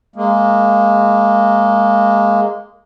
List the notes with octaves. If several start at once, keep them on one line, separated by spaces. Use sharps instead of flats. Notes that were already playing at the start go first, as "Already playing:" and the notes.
G#3 A#3